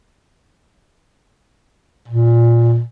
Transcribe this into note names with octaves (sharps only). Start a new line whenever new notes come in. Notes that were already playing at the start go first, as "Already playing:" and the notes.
A#2